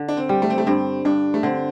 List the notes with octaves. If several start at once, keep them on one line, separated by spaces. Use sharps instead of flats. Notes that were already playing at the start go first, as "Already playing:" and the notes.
Already playing: D3
D4
C4
G3
A3
C4
A3
G2 C4
G2 D4
A3
D3 C4